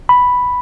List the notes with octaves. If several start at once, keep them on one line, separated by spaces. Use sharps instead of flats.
B5